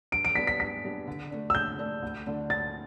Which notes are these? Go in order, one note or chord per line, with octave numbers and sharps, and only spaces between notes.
G2 D7
D7
G3 B3 D4 B6
B6
G2 B6
G3 B3 D4
D3
A3 D4
E6
D3 G6
A3 D4
D2
D3 A3 D4
D2 A6